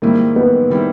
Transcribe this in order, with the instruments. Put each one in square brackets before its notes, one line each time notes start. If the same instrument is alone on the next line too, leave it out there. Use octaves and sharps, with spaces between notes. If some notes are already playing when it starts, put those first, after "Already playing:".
[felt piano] G#2 D#3 G3 C4 E4 [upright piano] A#3
[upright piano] B3
[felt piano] D#3 G3 C4 E4